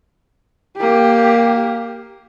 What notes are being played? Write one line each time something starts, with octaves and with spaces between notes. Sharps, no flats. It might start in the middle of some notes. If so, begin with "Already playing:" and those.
A#3 G4